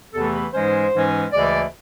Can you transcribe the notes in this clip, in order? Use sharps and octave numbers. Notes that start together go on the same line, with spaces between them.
E2 C3 E3 A3 A4
B4
G#2 E3 G#3 C#4 C5
G#2 E3 G#3 C#4
D2 C#3 E3 G#3 D5